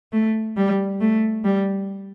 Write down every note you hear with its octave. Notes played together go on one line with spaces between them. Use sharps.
A3
G3
A3
G3